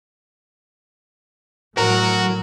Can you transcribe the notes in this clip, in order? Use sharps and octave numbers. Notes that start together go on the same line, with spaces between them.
A2 F#3 F#4 A#4